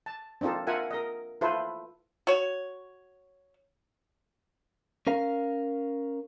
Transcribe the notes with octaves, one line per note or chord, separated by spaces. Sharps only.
A5
C4 D4 D#4 F4 A4
F4 A#4 E5 F#5 G#5
A#4 D#5
E4 F4 A4 B4 C5
F#4 C#5
C#4 A#4 F5